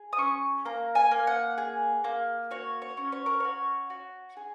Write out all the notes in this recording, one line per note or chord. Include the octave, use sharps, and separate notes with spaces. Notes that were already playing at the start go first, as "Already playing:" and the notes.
Already playing: G#4
D#6
C#4 C#6
A#3 A#5
G#5
A#3
F#5
G#4
A#3
F#4 C#5
C#5
C#4
C#5
A#4
F#4 C#5
F#4
G#4